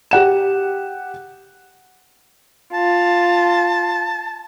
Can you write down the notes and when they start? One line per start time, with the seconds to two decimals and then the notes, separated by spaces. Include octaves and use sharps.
0.11 G4 F#5 E7
2.74 F4 A5